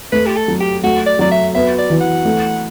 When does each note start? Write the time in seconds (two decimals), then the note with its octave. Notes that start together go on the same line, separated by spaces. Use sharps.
0.12 A3 B4
0.26 G4
0.37 A4
0.48 F#3
0.60 G4
0.83 A3 F#4
1.07 D5
1.19 F#3 D5
1.31 E5
1.55 B3 E5
1.79 D5
1.90 E3
2.01 F#5
2.25 A3